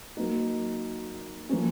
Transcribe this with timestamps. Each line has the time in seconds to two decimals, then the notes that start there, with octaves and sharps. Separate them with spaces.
0.17 F#3 A#3 D#4
1.49 F3 A#3 C#4